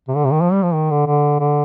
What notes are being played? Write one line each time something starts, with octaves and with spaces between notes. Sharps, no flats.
C3
D3
C3
D#3
F3
G3
F3
D#3
D3
D3
D3